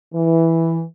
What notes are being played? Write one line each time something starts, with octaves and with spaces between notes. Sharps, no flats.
E3